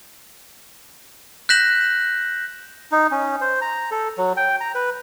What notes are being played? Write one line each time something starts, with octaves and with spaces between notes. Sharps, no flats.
F#6 G6 A#6 B6 E7 F#7
D#4
C#4
C5
A#5
A4
F#3
G5
A#5
B4